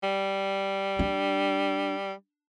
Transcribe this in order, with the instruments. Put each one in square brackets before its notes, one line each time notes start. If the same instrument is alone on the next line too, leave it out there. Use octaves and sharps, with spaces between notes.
[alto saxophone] G3
[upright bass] D4